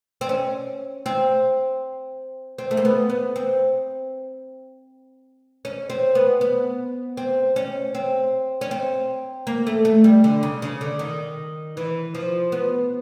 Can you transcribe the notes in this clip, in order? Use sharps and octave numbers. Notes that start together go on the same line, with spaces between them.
C4
C#4
C4
C4
A3
A#3
B3
B3
C4
C#4
C4
B3
B3
C4
C#4
C4
C#4
C4
A#3
A3
A3
G3
D3
C#3
C#3
D3
D#3
E3
F3
B3